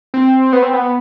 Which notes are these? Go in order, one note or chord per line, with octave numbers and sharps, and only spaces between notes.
C4
B3
C4
B3